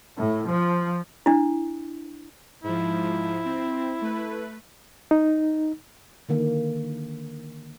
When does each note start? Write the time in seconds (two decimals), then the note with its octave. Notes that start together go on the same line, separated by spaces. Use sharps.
0.17 A2
0.46 F3
1.26 D4 E4
2.64 G#2 F3 E4
3.45 C4
4.01 A3 B4
5.11 D#4
6.29 D3 D#3 A#3